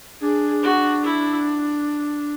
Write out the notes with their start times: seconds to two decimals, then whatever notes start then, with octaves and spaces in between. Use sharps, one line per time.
0.21 D4 G#4
0.63 F#4
1.05 E4